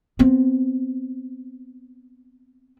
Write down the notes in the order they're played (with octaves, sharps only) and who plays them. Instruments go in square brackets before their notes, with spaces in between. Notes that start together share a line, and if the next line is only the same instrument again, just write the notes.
[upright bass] B3 C4